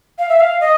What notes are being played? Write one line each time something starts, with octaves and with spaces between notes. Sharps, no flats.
F5
E5
F5
D#5